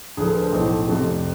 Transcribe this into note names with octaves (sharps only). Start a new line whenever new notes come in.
D2 D3 F3 G#4
A4
B4
C5
B1 A2 F3
F1 F2 C3